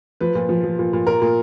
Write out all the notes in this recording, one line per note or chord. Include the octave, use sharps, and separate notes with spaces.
F3 B4
A#2
F3
F3
A#2
A#2
A#2 A#4
A#2